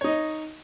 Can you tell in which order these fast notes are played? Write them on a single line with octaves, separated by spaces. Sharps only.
C#5 D#4 D#5